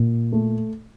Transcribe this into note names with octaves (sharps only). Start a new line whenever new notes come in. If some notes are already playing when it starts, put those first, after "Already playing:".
Already playing: A#2
A3